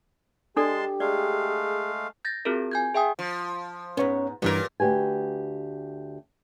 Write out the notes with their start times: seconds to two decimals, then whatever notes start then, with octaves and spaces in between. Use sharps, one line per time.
0.57 G#3 D4 G4 A4 D5 A5 C6
1.00 G#3 A3 G#4 D5 F5
2.25 G6 A6 A#6
2.45 C4 F4 F#4 G#4 A#4
2.71 G#5 G6 G#6
2.94 G#4 E5 G5 G#5 D#6
3.19 F3
3.97 G#2 B3 C#4 C#5
4.42 G2 A#2 E3 G3 B3 C#4 G4 A#4
4.80 D2 G4 B4 G#5